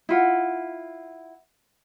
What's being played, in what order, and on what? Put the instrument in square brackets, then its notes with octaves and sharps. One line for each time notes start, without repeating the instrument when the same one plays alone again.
[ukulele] E4 F4 F#5